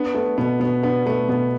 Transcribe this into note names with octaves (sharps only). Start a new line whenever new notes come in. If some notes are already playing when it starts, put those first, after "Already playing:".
Already playing: B3 D4
A3 B3
B2 B3
B2 B3
B3 D4
A3 B3
B2 B3